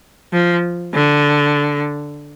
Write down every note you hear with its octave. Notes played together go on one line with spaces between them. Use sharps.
F3
D3